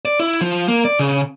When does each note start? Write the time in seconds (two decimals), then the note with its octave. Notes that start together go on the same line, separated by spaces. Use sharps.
0.05 D5
0.20 E4
0.41 F3
0.68 A#3
0.85 D5
0.99 C#3